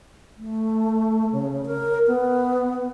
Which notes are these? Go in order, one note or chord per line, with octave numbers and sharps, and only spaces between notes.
A3
C#3
A#4
B3